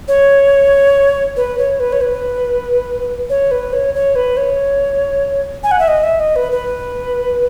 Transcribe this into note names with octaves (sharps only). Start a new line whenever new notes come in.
C#5
B4
C#5
B4
C#5
B4
C#5
B4
C#5
C#5
B4
C#5
G#5
F#5
E5
D#5
E5
D#5
B4
B4